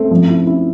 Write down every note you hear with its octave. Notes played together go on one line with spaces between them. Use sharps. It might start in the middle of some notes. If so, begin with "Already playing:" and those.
Already playing: A3 C4
F3
E4
E4